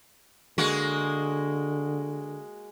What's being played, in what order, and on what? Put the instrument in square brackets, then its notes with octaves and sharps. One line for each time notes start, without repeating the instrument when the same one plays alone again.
[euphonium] D3 [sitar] G#3 A#3 F#4